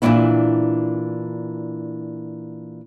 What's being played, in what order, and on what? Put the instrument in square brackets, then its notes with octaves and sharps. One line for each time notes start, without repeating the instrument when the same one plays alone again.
[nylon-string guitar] A#2 E3 A#3 C#4 D4 E4